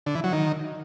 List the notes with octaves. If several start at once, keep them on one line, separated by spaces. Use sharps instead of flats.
D3
E3
F#3
D#3